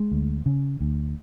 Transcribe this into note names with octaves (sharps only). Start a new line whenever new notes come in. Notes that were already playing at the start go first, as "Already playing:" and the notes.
Already playing: G#3
D2
C#3
D2